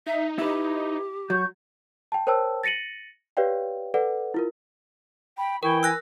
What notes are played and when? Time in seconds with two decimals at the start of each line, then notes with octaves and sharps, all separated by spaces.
0.07 D#4 E5
0.38 E4 G4 B4
1.30 F#3 F#4 C#6 G6
2.12 G5 A5
2.27 A#4 C5 C#5 G5 A5 E6
2.64 A6 A#6 C#7 D#7 F#7
3.37 G4 B4 C#5 D5 F5 G5
3.94 A4 B4 D5 F#5
4.34 E4 F4 A#4
5.38 G5 B5
5.63 E3 E4 A#4 G5 C#6
5.83 G#5 E6 F#6 A#6